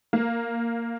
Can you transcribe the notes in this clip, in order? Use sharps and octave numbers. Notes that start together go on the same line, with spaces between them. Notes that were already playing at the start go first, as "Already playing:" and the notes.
A#3